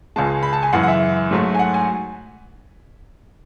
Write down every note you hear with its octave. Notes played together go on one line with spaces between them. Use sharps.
C#2 C#3 G#3 A5
B5
A5
G#5
F#2 C#3 E3 G#3 F#5
F#5
E5
G#2 F#3 A3
G#5
F#5
G#5